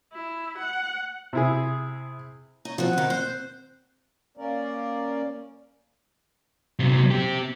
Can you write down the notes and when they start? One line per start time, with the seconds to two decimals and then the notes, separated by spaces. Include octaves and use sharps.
0.13 E4
0.58 F#5
1.33 C3 E4 G#4
2.65 D#4 C#5
2.78 F3 F#3 C4 F#4 F#5
2.93 D#3 F3
3.10 C5 F#6
4.37 A#3 C#4 A#4 D5
6.80 C3 F#3
7.11 C4 G4